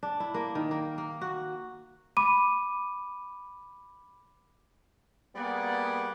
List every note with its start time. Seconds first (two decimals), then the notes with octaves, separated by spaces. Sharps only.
0.03 D4
0.20 E4
0.34 A#3
0.55 D#3
0.71 A#3
0.98 A#3
1.21 F#4
2.17 B5 D6 D#7
5.35 G3 A#3 B3 G#4 D5 F#5